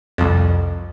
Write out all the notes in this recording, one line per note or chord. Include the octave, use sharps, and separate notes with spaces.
C2 F2